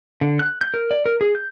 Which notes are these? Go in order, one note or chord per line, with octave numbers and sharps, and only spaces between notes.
D3
F#6
G6
A#4
D5
A#4
G#4
G6